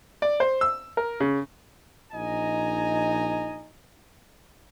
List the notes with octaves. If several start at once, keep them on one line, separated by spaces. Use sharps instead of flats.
D5
C5
E6
A#4
C#3
A#1 D#4 D#5 G#5 A#5